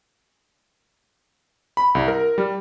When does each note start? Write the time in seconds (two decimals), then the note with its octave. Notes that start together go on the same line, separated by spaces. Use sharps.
1.77 B5
1.95 C2
2.08 A#4
2.38 G3